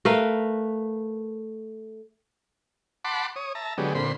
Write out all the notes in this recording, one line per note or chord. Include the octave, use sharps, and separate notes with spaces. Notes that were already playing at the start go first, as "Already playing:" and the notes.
A3 A#4 B4 F5
F#5 A5 B5 C6 D6
C#5 D#6
E5 A5 A#5
D3 F#3 G#3 B3 G4
A#2 D3 C4 B5 C6